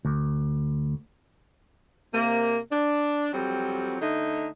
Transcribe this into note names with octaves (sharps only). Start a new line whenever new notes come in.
D2
C3 A#3
D4
F2 F#3 G3 C4
D3 A3 D#4